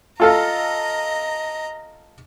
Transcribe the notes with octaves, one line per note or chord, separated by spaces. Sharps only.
F4 A4 D#5 F5 A#5